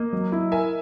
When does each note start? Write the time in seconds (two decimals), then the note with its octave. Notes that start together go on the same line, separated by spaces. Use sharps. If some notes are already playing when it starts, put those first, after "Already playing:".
Already playing: A#3 D#5
0.13 F#3
0.32 E4
0.52 A#4 E5 G#5